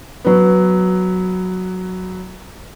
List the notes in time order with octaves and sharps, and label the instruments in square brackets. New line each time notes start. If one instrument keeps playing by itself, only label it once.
[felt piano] F#3 B3